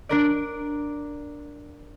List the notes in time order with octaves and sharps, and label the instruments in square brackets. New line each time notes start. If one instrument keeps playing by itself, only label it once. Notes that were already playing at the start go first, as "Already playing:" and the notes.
[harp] D4 A#4 D5